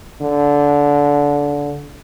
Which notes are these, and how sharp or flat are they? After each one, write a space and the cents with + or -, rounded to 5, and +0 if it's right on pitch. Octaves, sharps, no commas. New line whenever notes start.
D3 -20